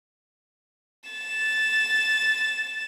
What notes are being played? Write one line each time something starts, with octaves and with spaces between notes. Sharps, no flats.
A6 E7